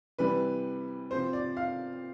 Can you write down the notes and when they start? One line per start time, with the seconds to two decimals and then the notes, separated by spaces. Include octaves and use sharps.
0.19 C3 E3 G3 B4
1.10 C3 F3 C4 C5
1.33 D5
1.57 F5